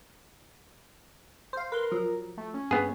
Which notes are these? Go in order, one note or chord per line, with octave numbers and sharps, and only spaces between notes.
C5 F5
A#4 B4 C6
F3 F#3
A3
C#4
G2 B3 G#4